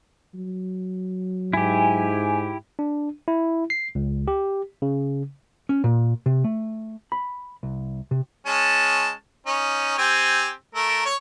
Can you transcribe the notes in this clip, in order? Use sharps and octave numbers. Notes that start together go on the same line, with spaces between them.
F#3
G#2 E4 G4 G#5
D4
E4
C7
C#2
G4
C#3
C#4
A#2
C3
A3
B5
C2
C3
G#3 C#4 A5
C#4 D#4
C4 G4 G#5
A3 A#4
C#5